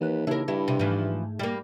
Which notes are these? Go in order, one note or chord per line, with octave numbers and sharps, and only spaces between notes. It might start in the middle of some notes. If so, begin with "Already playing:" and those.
D#2 E3 B4
D#2 C#3 D4 E4 A#4
G2 E4
C3
G#2 E3 F3 A3
G3 A#3